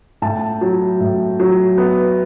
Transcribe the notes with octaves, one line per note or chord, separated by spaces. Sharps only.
A2 A5
F#3
A2
F#3
B3